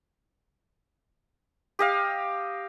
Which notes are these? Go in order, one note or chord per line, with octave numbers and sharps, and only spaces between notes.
G4 D#5 F5